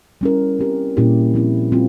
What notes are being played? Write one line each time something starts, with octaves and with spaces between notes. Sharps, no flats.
G3 C#4 E4 A#4
G3 C4 G4 A#4
A#2 G3 C#4 E4 G4
F3 C4 E4
G3 C4 F4